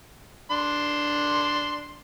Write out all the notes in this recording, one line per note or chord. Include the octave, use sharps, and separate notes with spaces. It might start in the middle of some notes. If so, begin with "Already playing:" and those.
D4 C6